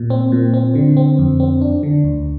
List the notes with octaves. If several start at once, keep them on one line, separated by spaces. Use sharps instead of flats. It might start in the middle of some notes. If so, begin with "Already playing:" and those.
Already playing: A#2
C4
A#2
C4
D3
C4
F2
C4
D4
D3
D2